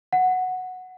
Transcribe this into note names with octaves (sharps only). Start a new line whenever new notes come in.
F#5